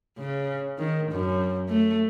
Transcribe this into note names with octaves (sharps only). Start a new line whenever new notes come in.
C#3
D#3
F#2
A3